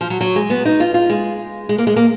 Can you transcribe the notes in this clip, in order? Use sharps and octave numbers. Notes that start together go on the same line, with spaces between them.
F3
F#3
F#3
G#3
B3
D#4
F4
F4
G#3
G#3
A#3
G#3
A#3